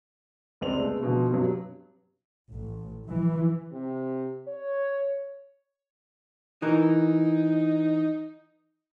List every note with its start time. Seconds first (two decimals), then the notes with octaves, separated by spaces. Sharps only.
0.61 C#2 C4 D5 F7
0.77 C#3 G#3 A3 B3
1.02 B2 D3 F3
1.31 G2 B2 F#3
2.49 A1
3.06 E3
3.72 C3
4.47 C#5
6.62 E3 D#4 A#4